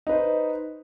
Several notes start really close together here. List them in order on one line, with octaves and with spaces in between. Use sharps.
D#4 B4 C5